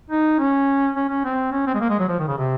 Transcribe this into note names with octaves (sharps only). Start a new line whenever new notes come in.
D#4
C#4
C#4
C#4
C4
C#4
C4
G#3
A#3
G#3
F#3
F3
D#3
C#3
C3